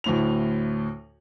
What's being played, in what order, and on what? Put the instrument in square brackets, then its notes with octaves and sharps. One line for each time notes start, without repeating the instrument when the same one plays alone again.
[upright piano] D2 A2 F7